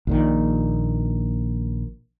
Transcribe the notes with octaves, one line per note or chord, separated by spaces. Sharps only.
A#1 A#2 D#3